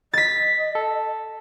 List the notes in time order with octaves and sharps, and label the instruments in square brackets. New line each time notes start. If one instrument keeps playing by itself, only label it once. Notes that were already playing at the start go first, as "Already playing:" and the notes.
[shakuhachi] D#5 [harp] A6 B6
[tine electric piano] A4